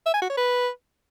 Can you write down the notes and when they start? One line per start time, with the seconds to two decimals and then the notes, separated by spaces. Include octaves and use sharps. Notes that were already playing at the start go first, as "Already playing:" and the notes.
0.06 E5
0.14 G#5
0.22 F#4
0.29 C#5
0.37 B4